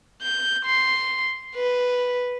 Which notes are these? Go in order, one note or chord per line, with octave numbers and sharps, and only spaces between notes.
G6
C6
B4